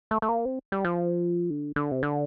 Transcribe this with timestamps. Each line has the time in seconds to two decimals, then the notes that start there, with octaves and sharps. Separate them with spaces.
0.11 A3
0.22 A3
0.29 A#3
0.45 C4
0.72 G3
0.85 F3
1.50 D3
1.76 D3
1.92 C3
2.03 D3